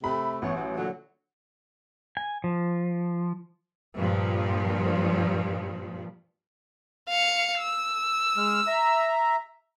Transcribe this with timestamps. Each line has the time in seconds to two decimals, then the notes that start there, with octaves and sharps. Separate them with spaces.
0.04 C3 A3 B5
0.42 A1 B3 C#5
0.56 F#3
0.77 A#2 D3 F#3
2.17 G#5
2.44 F3
3.96 G2 A#2 F3
7.09 F5 C#7
7.58 E6
8.37 G#3 F6
8.67 E5 A#5